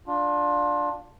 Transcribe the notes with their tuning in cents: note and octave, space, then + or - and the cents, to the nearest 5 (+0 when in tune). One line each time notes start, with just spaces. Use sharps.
D4 +0 F4 +20